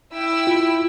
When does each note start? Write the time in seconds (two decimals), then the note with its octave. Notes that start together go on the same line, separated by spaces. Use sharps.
0.15 E4 G5 E6
0.47 F4